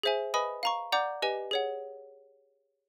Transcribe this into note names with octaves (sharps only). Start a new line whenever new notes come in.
G#4 C5 E5 G#5
B4 D#5 G#5 B5 D#6
F5 A#5 C#6
D5 F#5 A#5 D6 G6
G4 B4 D#5 G#5
G#4 C#5 F#5